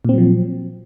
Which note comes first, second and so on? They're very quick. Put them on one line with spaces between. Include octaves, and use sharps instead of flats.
A#2 C4 F#3 F3